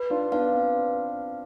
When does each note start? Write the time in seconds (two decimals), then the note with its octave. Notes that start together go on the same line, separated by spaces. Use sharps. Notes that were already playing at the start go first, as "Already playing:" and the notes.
Already playing: B4
0.10 D4 F4
0.32 B3 D4 F5
0.53 C4